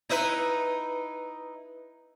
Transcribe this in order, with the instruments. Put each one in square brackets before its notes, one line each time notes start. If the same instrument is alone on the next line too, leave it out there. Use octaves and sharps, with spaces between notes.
[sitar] D#4 E4 B4